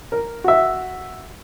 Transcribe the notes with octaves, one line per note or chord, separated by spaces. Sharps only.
A#4
F#4 E5